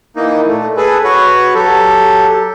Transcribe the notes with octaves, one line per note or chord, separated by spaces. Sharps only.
E3 A#3 D#4
A#2 A3
G#4 A4 B4
F#4 B4 C#5
F#3 G4 A4